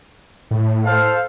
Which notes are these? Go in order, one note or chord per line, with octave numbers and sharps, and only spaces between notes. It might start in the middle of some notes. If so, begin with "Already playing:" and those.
A2
A4 C5 F5